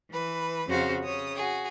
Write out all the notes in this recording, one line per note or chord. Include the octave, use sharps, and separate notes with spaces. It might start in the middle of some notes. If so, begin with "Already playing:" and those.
E3 B4
F2 C#3 F#4 G4 C5 F5
C#3 C#5 D#6
F#4 G#4